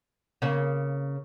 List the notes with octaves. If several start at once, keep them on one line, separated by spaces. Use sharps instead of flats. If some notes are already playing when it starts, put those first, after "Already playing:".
C#3 A#3